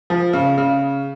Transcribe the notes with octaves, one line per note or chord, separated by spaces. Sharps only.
F3
C#3
C#3